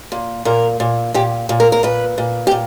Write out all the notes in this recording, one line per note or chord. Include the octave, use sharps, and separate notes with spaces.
A#2
A#2 A#4
A#2
A#2 G4
A#2
A#4
A#4
A#2 B4
A#2
G4
A#2